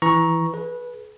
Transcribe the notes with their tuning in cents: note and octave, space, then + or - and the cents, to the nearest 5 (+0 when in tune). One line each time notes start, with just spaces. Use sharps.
E3 +0 A#5 +15 C#6 +0
G#4 +40 B4 -15